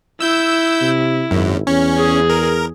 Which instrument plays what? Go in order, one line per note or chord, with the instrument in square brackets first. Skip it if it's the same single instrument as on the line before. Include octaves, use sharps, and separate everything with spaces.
[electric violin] E4 [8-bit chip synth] E6 G6
[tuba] C3
[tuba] G#1 [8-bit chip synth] F#2
[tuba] E2 [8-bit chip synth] C#4
[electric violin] G#4
[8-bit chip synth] A#4